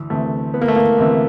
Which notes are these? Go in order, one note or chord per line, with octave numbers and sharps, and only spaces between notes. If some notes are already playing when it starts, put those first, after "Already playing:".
Already playing: D2 E3
D2 C3 E3 A3
B3
A#3
A3
A#3
D2 C3 E3